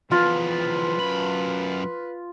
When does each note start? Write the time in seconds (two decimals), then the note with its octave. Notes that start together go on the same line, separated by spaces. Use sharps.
0.11 E2 F3 F4 B4
0.98 F#2 B5